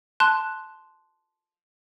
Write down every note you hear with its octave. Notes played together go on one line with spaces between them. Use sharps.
A5 C6 F#6